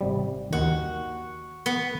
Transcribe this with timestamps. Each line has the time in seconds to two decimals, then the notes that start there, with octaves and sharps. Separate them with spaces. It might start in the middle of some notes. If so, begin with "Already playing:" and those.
0.01 G#1 C3 G3
0.53 D#2 D#3 F#4
1.66 B3